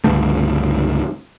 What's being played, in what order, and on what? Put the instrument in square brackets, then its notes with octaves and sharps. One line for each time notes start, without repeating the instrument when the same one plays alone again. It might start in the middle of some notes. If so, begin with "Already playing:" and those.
[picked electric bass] C#2 G2 D3 A3